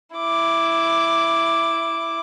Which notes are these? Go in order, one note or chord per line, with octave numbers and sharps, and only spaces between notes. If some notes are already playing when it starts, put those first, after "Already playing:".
E4 D6